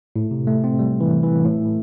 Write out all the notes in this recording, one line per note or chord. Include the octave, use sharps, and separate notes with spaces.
A2
C3
A3
C4
G3
E3
E3
A2